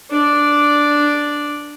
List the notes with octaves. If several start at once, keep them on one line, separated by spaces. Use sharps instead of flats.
D4 D5